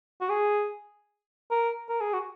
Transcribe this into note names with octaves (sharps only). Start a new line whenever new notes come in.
F#4
G#4
A#4
A#4
G#4
F#4